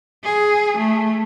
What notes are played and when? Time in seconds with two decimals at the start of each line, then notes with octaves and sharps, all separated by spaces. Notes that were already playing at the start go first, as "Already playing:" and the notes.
0.24 G#4
0.77 A3